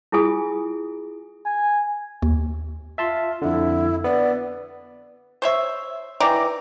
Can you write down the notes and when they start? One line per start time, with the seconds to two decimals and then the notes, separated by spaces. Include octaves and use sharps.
0.12 E4 F4 G#4 G#5 D#6
1.46 G#5
2.22 D#2
2.98 F4 E5 A5 C6
3.42 F2 D3 E4
4.04 B3 D5
5.42 C5 C#5 E5
6.20 D#3 E3 D5 A#5